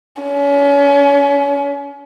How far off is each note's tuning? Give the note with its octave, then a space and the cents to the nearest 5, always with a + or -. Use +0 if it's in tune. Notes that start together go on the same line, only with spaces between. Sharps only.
C#4 +35